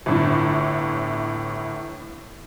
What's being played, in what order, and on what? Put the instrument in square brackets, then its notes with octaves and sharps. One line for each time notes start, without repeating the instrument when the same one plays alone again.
[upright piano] G1 A2 D3